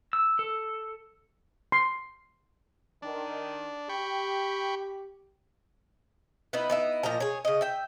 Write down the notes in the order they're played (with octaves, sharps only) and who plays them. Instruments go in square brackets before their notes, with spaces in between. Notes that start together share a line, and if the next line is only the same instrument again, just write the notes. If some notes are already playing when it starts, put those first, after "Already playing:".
[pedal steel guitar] E6
A4
[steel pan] C6
[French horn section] D#3 [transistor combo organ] D4
[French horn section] G4 [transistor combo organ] G5 B5 C#6
[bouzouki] B3 D#4 E4 B4
B3 D#4 E4
A#2 F3 D#5 A#5
G#4 C#5
C#3 D#5
E5 G5